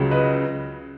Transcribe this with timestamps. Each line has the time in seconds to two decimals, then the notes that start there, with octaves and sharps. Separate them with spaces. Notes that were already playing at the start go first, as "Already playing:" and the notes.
Already playing: C#2 C#3 F#3
0.11 B4 D#5